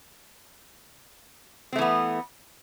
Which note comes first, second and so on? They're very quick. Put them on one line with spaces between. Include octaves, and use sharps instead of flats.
C4 A3 E3 B3